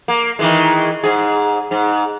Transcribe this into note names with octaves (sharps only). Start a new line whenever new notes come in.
A#3
D#3 E3 G#3
G#2 G#4
G#2